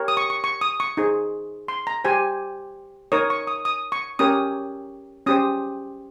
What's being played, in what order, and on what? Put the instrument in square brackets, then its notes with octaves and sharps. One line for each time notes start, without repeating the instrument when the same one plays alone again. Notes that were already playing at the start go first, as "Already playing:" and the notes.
Already playing: [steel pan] G4 A#4 C#5
D#6
C#6
C#6
C#6
D#6
C#6
D#4 G#4 C5
C6
A#5
G4 C5 G#5
D#4 A#4 C#5 D#6
C#6
D#6
D#6
C#6
C#4 G4 A#4 C#5 D#6
C#4 G4 C5 D#6